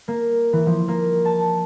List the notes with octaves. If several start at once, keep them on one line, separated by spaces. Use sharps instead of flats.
A#3
E3
F3
A#3
A5